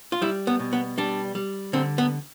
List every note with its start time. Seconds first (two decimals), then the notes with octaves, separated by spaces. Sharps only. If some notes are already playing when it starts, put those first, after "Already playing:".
0.12 F4
0.22 G3 E4
0.47 B3
0.60 B2
0.73 B3
0.98 G3 D4
1.35 G3
1.73 D3 C4
1.98 B3